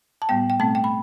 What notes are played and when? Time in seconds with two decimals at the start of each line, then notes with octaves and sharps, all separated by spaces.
0.22 A5
0.29 A2 G3 B3 G5
0.50 G5
0.59 B2 A3 C4 A5
0.75 G5
0.84 B5